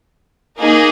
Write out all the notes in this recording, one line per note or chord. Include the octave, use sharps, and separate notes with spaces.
A#3 D#4 G#4